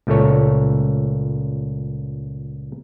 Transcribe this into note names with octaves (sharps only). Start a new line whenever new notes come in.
C#2 A#2 A3 A4 C#5